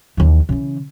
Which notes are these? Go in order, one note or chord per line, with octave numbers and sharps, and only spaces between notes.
D#2 E3
C#3 E3